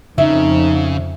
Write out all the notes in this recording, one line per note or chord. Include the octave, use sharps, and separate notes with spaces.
F2 C#3 D#4 E5